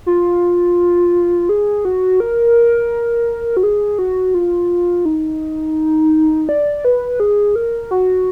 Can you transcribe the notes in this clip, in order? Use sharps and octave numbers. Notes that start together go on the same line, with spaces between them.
F4
G#4
F#4
A#4
F#4
G#4
F#4
F4
D#4
D5
B4
G#4
A#4
F#4